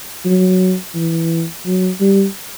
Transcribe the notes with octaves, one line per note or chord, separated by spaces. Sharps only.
F#3
E3
F#3
G3